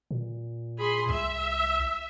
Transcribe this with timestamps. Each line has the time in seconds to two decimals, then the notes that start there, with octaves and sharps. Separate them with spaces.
0.11 A#2
0.77 G#4 B5 C6
1.09 C2 E5